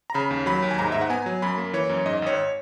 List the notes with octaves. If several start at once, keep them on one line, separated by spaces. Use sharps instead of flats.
A#5
C#3 B5
D#2
F#3 B5
D#2
G#5
G#2 A#5
G#2 E5
F#5
B3 G#5
F#3
F#2 B5
A#3
E3 C#5
F#2
G#2 D#5
G#1 C#5